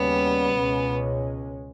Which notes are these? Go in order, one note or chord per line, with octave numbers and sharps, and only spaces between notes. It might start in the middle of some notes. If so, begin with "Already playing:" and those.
Already playing: D#2 C#3 G3 B3 C#4
C#2 B2 G#3 C#4